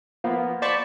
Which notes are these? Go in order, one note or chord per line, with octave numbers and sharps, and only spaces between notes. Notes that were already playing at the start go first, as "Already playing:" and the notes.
F3 A#3 B3
C5 D5 A5 B5 C#6